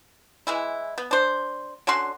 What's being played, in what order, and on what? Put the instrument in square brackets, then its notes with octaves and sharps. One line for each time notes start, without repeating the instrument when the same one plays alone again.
[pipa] E3 G#3 E4
B3
D4 C5
D3 C#4 F#4 C6